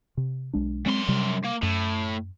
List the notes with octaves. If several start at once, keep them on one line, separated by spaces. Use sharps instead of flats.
C3
B1 G#3 D4
F#2 G#3 C4 C6
C3 G3
A#3
F#2 A2